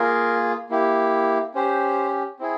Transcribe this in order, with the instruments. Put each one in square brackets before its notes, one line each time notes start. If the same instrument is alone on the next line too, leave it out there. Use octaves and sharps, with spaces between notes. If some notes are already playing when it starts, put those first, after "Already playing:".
Already playing: [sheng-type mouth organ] A#3 F4 G#4 A#4
A#3 E4 G4
C#4 G4 C5
C4 E4 G#4